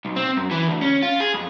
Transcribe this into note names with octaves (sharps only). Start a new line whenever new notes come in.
B1
C4
F#2
E3
D2
C#4
F4
G#4
F2